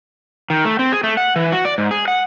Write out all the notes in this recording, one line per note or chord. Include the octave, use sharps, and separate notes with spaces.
D#3
A3
C4
G#4
A3
F#5
E3
F#4
D5
G#2
G#4
F#5